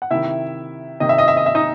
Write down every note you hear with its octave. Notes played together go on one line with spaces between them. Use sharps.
F#5
C3 D#3 E4 E5
C3 D#3 D#5
E5
D#5
E5
D#5
E5
D#4 D#5